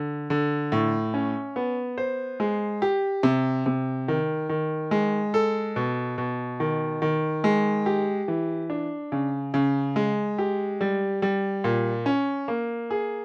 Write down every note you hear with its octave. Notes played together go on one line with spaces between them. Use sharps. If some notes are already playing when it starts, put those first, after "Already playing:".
Already playing: D3
D3
A2
C#4
B3
C5
G#3
G4
C3
C3
D#3
D#3
G#3
A4
B2
B2
D#3
D#3
G#3
G4
E3
D4
C#3
C#3
G#3
G4
G3
G3
A#2
C#4
A#3
G#4